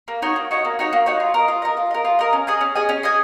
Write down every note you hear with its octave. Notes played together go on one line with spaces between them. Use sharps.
A#3
D#4 F#4 C#5
A#3
D#4 F#4 C#5
A#3
D#4 F#4 C#5
A#3
D#4 F#4 C#5
F4
A#4 D#5
F4
A#4 D#5
F4
A#4 D#5
F4
A#4 D#5
C#4
G#4 D#5 G#5
C#4
G#4 D#5 G#5
C#4
G#4 D#5 G#5